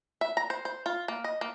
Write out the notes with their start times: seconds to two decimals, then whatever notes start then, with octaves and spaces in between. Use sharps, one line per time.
0.21 E5
0.37 A#5
0.50 C5
0.65 C5
0.86 F4
1.08 A#3
1.24 D#5
1.41 A#3